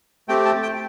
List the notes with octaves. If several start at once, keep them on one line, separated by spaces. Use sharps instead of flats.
A3 C4 G4 G5
A5
G5